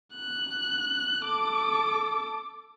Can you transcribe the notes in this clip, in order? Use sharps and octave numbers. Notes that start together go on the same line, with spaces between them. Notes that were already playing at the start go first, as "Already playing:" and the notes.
F#6
A4 D6